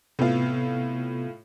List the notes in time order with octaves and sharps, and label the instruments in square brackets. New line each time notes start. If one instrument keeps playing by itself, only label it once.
[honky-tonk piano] A2 F4 [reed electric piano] C3 B3